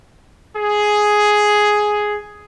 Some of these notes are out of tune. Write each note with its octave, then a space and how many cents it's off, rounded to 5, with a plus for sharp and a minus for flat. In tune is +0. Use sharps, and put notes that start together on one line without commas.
G#4 +5